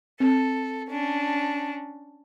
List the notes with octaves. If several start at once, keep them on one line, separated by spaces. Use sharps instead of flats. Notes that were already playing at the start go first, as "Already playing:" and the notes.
C4 A4
C#4 D4